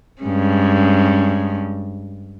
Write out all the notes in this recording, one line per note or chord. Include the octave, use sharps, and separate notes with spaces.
G2 G#3 C#4